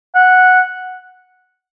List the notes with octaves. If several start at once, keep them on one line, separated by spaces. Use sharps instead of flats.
F#5